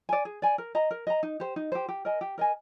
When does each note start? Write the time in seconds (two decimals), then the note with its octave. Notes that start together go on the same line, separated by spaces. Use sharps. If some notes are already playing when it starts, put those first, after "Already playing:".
0.09 D5 G#5
0.25 G#4
0.42 D5 G#5
0.58 A#4
0.75 D#5 A#5
0.91 A#4
1.07 D#5 A#5
1.23 D#4
1.40 G4 C5
1.56 D#4
1.72 G4 C5
1.89 G4
2.05 A#4 D#5 G#5
2.21 G4
2.38 A#4 D#5 G#5